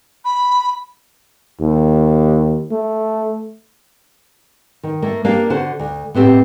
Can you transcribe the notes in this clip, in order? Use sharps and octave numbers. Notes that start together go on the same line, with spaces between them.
B5
D#2
A3
D#3
A3 A#3
A#3 D4 G4 F5
D3 F#4 C5
D2
A2 B3 C4 G4